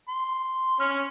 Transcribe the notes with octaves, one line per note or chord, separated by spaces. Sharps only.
C6
C#4 F6